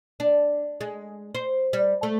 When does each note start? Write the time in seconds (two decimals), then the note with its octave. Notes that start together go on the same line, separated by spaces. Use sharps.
0.20 D4
0.81 G#3
1.35 C5
1.73 G3
2.03 A3